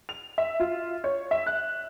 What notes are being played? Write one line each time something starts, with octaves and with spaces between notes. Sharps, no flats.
F7
E5
F4
C#5
E5
F#6